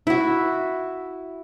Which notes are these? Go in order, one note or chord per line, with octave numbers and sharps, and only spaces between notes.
E4 F#4